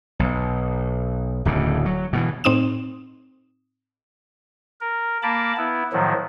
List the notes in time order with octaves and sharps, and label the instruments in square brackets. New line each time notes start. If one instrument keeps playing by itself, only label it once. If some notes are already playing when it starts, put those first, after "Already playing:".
[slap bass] B1
D1 D2 C#3
F#3
B2 D#3 E3
[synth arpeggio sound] A2 C4 D#4 D#6 E7
[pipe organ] A#4
A#3 A#4 A5 B5 D6
B3 E4
A2 D#3 F3 F#3